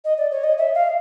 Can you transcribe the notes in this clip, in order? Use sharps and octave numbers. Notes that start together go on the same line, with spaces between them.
D#5
D5
C#5
D#5
E5
F5